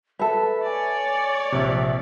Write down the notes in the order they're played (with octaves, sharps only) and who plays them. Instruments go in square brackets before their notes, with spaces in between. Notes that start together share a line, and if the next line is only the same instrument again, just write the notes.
[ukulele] A4 B4 [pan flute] E5
[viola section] C#5 D5 [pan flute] G#5
[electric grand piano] A#1 C3 [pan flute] E5